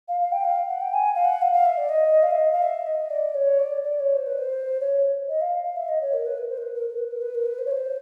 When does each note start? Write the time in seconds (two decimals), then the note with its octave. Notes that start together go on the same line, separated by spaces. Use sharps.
0.08 F5
0.20 F5
0.32 G5
0.44 F5
0.68 F#5
0.81 G5
0.93 G#5
1.15 F5
1.25 F#5
1.42 F5
1.53 F5
1.65 E5
1.78 D5
1.89 D#5
2.23 F5
2.31 E5
2.38 D#5
2.52 F5
2.62 E5
2.86 D#5
3.10 D5
3.34 C#5
3.59 D5
3.83 D5
3.99 C#5
4.16 C5
4.27 B4
4.38 C5
4.80 C#5
5.28 D#5
5.41 F5
5.64 F5
5.76 E5
5.88 D#5
6.01 C#5
6.13 A#4
6.26 B4
6.38 A#4
6.49 C5
6.58 A#4
6.62 B4
6.74 A#4
6.89 A#4
6.98 B4
7.11 A#4
7.22 B4
7.35 A#4
7.46 B4
7.58 C5
7.65 C#5
7.71 C5